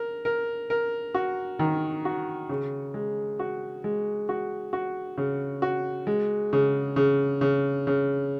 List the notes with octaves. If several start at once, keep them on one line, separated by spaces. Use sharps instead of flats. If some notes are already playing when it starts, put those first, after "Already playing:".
Already playing: A#4
A#4
A#4
F#4
D#3
F#4
C#3
G#3
F#4
G#3
F#4
F#4
C#3
F#4
G#3
C#3
C#3
C#3
C#3